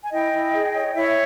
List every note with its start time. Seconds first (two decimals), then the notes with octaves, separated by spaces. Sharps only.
0.03 G#5
0.12 E4 D#5 G5
0.33 E4
0.54 G#4
0.74 C#5
0.95 E4 C#5 E5